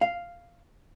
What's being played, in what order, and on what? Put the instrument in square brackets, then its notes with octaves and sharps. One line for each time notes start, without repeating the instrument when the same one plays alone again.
[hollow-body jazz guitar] F5